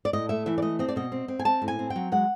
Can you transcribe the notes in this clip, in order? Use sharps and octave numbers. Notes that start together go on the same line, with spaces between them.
D5
A2 D#5
A3 E5
E3 E5
D5
A3 D#5
C4 D#5
D5
B2 D#5
C4
C4
G#5
C4 A5
A2
G#5
C4
G5
F#3
G#3 F#5